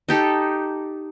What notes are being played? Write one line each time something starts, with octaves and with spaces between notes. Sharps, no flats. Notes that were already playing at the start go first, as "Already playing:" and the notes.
D#4 G4 A4